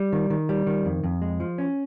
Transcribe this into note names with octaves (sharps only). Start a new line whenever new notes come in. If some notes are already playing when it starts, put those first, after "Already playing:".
Already playing: G3
D#3
D#3
G3
D#3
F2
F2
G#3
F3
C#4